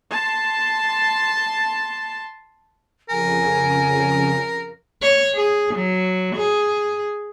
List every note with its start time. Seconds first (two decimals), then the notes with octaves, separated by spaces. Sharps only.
0.11 A5 C6
3.09 F2 C#3 A#4 G#5
5.02 C#5
5.35 G#4
5.75 F#3
6.35 G#4